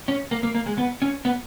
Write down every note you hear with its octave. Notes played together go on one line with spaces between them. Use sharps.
C#4
A#3
A#3
A#3
G#3
B3
C#4
B3